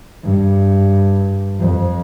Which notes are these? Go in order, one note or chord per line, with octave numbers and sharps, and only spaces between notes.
G2
F2